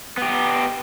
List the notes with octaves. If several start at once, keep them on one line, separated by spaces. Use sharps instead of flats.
B3 G4